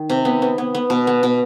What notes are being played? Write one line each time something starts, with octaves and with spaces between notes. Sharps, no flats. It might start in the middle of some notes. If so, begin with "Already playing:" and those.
Already playing: D#3
C3
B3
B3
B3
B3
B2
B3
B2